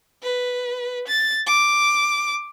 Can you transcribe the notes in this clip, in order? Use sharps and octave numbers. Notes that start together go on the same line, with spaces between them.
B4
A6
D6